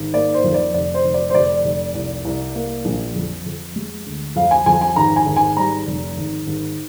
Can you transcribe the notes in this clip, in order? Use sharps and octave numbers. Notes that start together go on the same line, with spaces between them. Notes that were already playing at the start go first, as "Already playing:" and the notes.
Already playing: G#1
A#3 D5
C5
F2
D5
F1 D5
C5
F1
D5
C5
F1 D5
F1
C2
C2
A#3
A#1
F2
F2
G#3
D2
F2 F5
G#5
F2 G#5
G#5
G#1 A#5
G#5
G#1
G#5
G3 A#5
F1
G#1
G#1